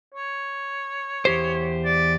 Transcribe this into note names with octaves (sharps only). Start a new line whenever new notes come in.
C#5
E2 G4 C5
D5